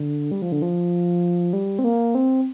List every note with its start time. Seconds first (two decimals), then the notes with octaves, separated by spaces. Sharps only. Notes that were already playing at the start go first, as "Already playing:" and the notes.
Already playing: D3
0.31 G3
0.42 F3
0.52 D3
0.62 F3
1.53 G3
1.79 C4
1.84 A#3
2.15 C4